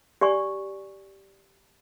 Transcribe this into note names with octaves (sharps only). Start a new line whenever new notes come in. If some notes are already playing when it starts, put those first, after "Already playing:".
G4 D5 G#5 C#6